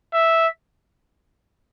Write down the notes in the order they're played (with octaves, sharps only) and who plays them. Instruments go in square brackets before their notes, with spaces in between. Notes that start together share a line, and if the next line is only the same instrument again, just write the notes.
[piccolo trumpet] E5